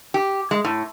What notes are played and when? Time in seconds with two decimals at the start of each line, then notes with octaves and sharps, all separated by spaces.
0.14 G4
0.51 G#3
0.65 A2